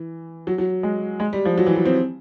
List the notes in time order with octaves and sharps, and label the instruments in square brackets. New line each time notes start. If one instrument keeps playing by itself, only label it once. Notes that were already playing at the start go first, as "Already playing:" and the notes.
Already playing: [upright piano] E3
F#3
F#3
G#3
G#3
G3
F3
F#3
E3
F#3
C4